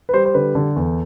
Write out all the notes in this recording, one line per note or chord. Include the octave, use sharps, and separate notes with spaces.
B4
G3 C5
C5
D3 B4
D3 A4
E2